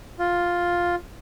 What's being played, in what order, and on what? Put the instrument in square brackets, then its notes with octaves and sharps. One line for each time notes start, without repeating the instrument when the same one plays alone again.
[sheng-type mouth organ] F4